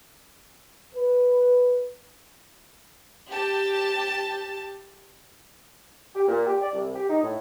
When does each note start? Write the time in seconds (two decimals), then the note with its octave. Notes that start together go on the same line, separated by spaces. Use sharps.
0.95 B4
3.29 G4 A5
6.16 G4
6.28 A#2
6.47 G4
6.62 D5
6.74 C2
6.96 G4
7.09 D#4
7.23 A2